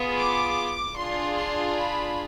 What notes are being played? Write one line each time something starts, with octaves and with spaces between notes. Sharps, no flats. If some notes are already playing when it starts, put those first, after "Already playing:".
Already playing: B3 F4 G#4
D6
D4 F4 G#4 C6
C6
B5